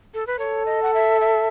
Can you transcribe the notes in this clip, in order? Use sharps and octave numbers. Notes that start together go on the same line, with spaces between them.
A4
B4
A4 C#5
D#5
F#5
E5
E5